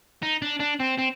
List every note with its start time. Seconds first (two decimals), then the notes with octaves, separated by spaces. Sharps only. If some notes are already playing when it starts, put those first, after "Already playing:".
0.23 D#4
0.42 D4
0.60 D4
0.80 C4
0.98 C4